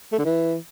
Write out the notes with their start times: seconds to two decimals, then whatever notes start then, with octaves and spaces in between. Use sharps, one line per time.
0.12 A3
0.19 D3
0.25 E3